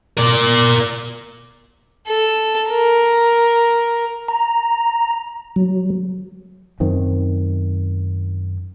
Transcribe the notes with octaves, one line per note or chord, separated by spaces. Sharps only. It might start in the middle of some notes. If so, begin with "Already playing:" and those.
A#4 D5
A4
A#4
A#5
F#3
F#2 D#3 C4